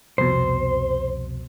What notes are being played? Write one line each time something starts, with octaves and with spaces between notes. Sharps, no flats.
C2 F2 B2 C5